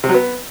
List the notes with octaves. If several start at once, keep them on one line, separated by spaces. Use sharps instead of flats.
C3
F#3
B3